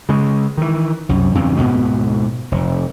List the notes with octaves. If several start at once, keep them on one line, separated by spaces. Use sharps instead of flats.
C#3 G#3
D#3 E3
C2 F#2
E2 G2 C#3 C4
D2 G#2 B2 B3
F1